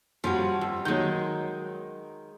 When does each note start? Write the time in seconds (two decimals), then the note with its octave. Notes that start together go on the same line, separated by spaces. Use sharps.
0.24 G2 F3 C#4 F#4
0.61 F2
0.85 D#3 F#3 G#3 G6